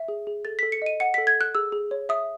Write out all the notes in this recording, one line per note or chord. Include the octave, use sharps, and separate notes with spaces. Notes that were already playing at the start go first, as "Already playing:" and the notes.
Already playing: E5
G#4
G#4
A4 A6
B6
A4
C#7
D#5 D#7
F#5 C#7
B6
A4
G#6
A4 F#6
G#4 E6
G#4
C#5
E5 D#6